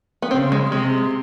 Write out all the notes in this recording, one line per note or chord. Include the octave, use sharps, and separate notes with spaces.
B3
C#3 C4
G#3
C3 G#3